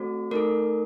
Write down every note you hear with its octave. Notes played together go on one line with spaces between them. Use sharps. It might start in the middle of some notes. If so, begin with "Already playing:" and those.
Already playing: A3 C4 F#4 A4 C5
A3 D#4 A4 A#4